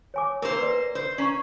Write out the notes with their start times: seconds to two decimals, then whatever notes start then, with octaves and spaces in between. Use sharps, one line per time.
0.14 C#5 G#5 D6
0.42 A#3 A#4 C5
0.58 B4 D5
0.95 C5
1.18 C#4 D5 A#5 C#6